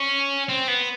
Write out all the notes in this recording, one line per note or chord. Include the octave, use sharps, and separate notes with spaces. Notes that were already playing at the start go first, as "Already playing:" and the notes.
Already playing: C#4
C4
B3